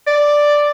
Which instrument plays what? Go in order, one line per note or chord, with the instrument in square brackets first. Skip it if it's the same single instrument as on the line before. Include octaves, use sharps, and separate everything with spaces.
[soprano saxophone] D5